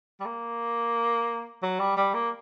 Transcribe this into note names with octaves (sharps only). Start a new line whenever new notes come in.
G3
A#3
F#3
G3
G3
A#3